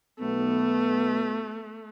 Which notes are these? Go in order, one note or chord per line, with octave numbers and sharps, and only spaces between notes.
B1 A3 B3